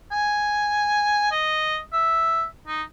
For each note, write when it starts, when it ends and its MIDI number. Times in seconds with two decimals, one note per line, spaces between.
0.12 1.27 80
1.31 1.78 75
1.93 2.44 76
2.67 2.82 63